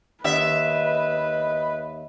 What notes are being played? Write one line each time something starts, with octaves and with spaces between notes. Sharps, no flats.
D#2 B4 D#5 E5